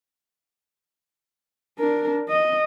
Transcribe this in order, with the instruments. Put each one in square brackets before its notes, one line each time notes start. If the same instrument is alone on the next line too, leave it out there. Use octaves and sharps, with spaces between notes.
[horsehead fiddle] D4 A#4
D#5